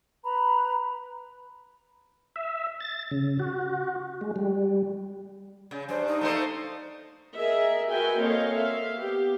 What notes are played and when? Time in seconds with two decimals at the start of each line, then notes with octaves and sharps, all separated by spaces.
0.24 B4 A#5 B5
2.36 E5
2.80 A6
3.11 C#3
3.39 F#4
4.21 G#3
4.36 G3
5.71 C#3
5.89 G2 C5
6.07 D#4
6.21 A3 A#3 C5
7.37 G#4 A#4 D#5 E5
7.90 F#4 A#4 B4 E5 G5 G#5
8.20 A#3 C4 A4 C#5 D#5 F5
8.55 E5 F5
8.95 B3 G4